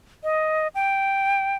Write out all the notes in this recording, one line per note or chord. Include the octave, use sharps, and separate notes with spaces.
D#5
G5